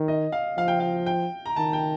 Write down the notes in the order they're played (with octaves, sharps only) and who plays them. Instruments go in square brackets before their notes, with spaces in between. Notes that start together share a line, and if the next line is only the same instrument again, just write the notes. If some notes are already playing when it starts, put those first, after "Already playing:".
Already playing: [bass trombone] D#3
[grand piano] D#5
F5
[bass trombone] F3 [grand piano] F5
[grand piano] G5
F5
G5
A#5
[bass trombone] D#3 [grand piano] A5
[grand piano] G5